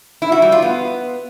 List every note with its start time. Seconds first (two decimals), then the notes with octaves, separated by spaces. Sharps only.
0.22 E4
0.32 F#4
0.42 G3
0.52 F4
0.62 B3